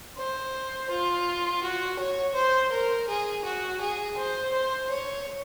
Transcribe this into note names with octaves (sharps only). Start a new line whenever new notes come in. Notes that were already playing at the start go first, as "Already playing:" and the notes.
C5
F4
F#4
C#5
C5
A#4
G#4
F#4
G#4
C5
C5
C#5